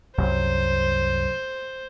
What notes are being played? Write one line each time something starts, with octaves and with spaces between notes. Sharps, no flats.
C2 F#2 C5